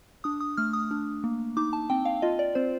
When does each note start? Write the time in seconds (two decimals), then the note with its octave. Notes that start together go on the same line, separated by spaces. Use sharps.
0.24 D4 D#6
0.40 D#6
0.57 A3 F6
0.73 D#6
0.91 D4
1.24 A#3
1.57 D#4 D6
1.73 A5
1.90 C4 G5
2.05 F5
2.22 F4 D#5
2.39 D5
2.55 C4 C5